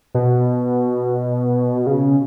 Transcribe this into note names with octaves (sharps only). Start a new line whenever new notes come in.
B2
C#3